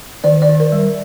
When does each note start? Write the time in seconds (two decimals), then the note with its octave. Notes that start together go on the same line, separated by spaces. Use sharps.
0.24 D#3 D5
0.42 D5
0.49 D#3
0.60 A#4
0.72 G3